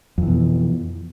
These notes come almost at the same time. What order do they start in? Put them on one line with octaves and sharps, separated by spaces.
F2 E3 B2